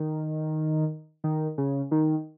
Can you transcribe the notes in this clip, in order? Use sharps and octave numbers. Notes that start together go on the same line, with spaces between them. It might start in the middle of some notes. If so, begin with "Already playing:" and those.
Already playing: D#3
D#3
C#3
D#3